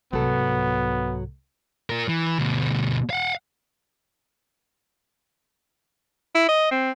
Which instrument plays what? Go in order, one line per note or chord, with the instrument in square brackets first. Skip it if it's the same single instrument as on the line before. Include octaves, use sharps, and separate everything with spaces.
[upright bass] C2 G#2 [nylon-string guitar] F#3 A4 [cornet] B3
[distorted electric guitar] F4 A#4
E3
D2 B2
F5 F#5
[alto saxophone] E4
D#5
C4